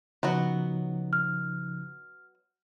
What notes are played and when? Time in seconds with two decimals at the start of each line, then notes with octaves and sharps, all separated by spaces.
0.23 C#3 F3 F#3 B3 D#4 F#4
1.13 F6